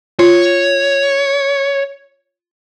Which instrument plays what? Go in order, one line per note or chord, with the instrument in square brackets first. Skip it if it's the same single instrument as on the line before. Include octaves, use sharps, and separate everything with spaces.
[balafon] F4 [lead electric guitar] C#5